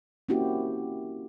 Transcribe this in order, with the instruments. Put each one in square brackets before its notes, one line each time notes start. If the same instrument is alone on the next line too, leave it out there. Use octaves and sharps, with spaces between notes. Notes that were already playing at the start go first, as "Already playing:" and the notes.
[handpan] A#3 C4 C#4 E4 F#4 G4